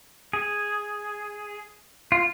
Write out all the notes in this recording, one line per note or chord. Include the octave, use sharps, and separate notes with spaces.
G#4
F4